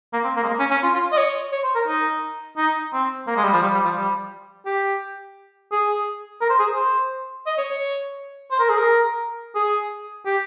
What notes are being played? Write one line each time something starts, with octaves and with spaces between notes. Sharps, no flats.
A#3
C4
A#3
G#3
A#3
C#4
C#4
F4
F4
D#5
C#5
C#5
C5
A#4
D#4
D#4
C4
A#3
G#3
G3
F3
G3
G3
F3
G3
G4
G#4
A#4
C5
G#4
C5
D#5
C#5
C#5
C5
A#4
G#4
A#4
G#4
G4